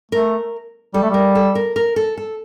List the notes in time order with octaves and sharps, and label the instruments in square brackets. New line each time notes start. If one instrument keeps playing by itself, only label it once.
[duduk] A3 [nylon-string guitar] A#4
[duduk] G3 [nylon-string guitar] A4
[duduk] A3
[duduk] G3 [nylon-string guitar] A#4
[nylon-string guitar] A4
A#4
A#4
A4
A4